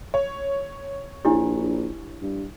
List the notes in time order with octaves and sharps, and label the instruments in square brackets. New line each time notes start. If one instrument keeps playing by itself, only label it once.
[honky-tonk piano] C#5
[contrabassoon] A#1 [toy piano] D4 E4 G4
[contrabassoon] G2